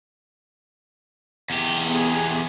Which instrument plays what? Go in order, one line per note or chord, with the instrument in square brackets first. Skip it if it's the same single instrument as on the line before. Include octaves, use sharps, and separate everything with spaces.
[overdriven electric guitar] E2 G4
[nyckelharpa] B3 G#4